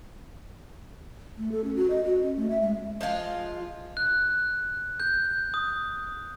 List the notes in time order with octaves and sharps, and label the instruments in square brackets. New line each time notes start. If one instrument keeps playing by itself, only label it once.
[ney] A3
A4
C#4
F#4
D#5
F#4
C#4
A3
E5
G#3
[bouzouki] F3 G#3 F4 F5
[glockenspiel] F#6
G6
D#6